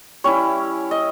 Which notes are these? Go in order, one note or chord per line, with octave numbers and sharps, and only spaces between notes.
G3 C#4 E4 C#5
D#5